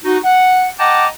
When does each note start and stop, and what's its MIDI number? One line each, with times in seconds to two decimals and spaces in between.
0.04 0.18 63
0.04 0.18 66
0.24 0.68 78
0.79 1.07 75
0.79 1.07 78
0.79 1.07 79
0.79 1.07 81
0.79 1.07 82
0.79 1.07 86